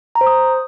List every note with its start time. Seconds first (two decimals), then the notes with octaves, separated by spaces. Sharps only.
0.15 A#5
0.21 C5
0.27 D#6